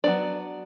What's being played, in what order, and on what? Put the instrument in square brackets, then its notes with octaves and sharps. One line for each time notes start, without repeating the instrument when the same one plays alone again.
[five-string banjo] F#3 B3 D4 D5